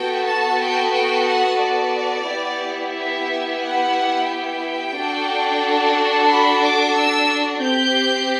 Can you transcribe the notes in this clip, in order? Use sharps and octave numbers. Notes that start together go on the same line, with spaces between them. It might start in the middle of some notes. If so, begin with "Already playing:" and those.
Already playing: B3 F#4 A4 G5
A5
G5
G5
F#5
D5
B3 E4 G4
E5
F#5
G5
D4 F#4 A4
B5
D6
E6
C4 G4 G6